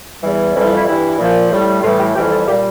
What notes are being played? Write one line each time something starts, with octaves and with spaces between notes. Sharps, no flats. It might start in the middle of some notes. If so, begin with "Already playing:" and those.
E2 E3 G3
F2 E3 G3 E4
E4
E4
G2 E3 G3 E4
A#2 F3
A2 G3
A2 E3 G3 F4
G4
F2 E3 G3 G4
A4
A#2 G3 G4